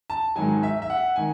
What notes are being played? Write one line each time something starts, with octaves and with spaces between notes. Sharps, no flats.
A5
G#2 D#3 F#3 G#5
E5
E5
F#5
D#3 G#5